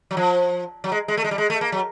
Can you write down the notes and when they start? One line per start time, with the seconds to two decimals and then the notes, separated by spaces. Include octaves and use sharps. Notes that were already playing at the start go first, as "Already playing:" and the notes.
0.11 F#3
0.17 F3
0.84 F#3
0.92 G#3
1.08 G#3
1.17 A3
1.24 G#3
1.31 G3
1.38 G#3
1.50 A3
1.61 A#3
1.72 F#3